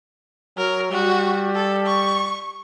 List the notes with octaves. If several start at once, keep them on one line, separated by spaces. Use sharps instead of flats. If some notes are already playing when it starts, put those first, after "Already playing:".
F#3 A#4
G3 F#4
A4
C#6